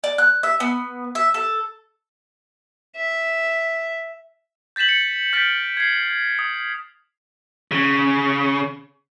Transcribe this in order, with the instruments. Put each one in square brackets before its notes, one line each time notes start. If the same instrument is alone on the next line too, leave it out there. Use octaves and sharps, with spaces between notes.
[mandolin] D5
F#6
E5
B3
E5
A4
[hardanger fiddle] E5
[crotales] G6 A6 B6 E7 F#7
C#7
F6 G6 A6 B6 D7
G#6 C7
D#6
[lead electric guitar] C#3